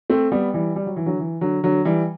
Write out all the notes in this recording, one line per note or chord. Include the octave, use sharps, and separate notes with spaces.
A3 C4
G3 B3
E3 G3
G3
F#3
E3
D3 F#3
E3
D3 F#3
D3 F#3
E3 G3